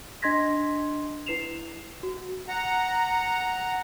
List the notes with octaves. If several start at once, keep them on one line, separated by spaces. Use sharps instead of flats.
D4 D#5 C6 G#6 A#6 B6
E4 B4 C7 E7 F7
F#4
F#5 A#5